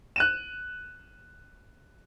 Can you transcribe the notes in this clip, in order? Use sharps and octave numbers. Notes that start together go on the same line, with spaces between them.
F#6 D#7 E7